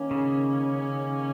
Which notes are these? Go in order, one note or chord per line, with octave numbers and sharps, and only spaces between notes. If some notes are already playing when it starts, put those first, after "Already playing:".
Already playing: D#3 A#3 C#4
C#3